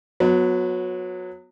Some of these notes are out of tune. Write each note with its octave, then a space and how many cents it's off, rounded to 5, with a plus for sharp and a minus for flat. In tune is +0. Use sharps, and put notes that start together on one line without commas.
F#3 -20 B3 +0